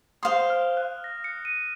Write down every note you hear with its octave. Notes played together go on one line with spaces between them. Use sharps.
C5 F5 C6 D#6
F6
F#6
A#6
C#7
D#7